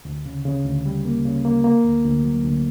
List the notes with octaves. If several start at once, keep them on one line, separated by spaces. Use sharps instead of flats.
D2
C#3
C#3
D2
G3
A#3
C#3
A#3
A#3
D2
D2
F#3
D2